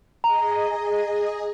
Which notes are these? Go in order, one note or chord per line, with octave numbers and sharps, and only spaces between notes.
G#4 D#5 A#5